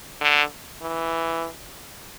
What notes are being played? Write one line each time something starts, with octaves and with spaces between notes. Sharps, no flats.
D3
E3